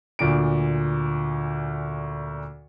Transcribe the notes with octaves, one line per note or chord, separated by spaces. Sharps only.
D2 A#2 D7